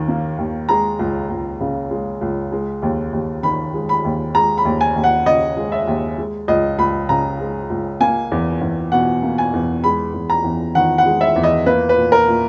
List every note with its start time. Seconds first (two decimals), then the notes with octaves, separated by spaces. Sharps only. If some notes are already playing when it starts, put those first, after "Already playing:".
Already playing: D#2 D#3
0.08 A#3
0.38 D#2
0.69 G#3 A#5
0.99 C#2
1.30 C#2
1.61 C#3
1.91 G#3
2.21 C#2
2.52 G#3
2.82 D#2
3.13 D#2
3.43 D#3 B5
3.74 G#3
3.89 B5
4.05 D#2
4.35 G#3 A#5
4.58 B5
4.65 D#2
4.81 G#5
4.96 D#2
5.04 F#5
5.26 C#3 D#5
5.57 G#3
5.72 E5
5.87 D#2
6.18 G#3
6.48 C#2 D#5
6.78 C#2 B5
7.09 C#3 A#5
7.40 G#3
7.70 C#2
8.01 A#3 G#5
8.32 E2
8.61 E2
8.92 B2 F#5
9.23 A#3
9.38 G#5
9.53 E2
9.84 G#3 B5
10.14 E2
10.30 A#5
10.44 E2
10.75 D#3 F#5
10.98 F#5
11.06 G#3
11.21 E5
11.36 E2
11.43 D#5
11.66 A#3 B4
11.89 B4
11.97 A#2
12.12 A#4
12.28 A#2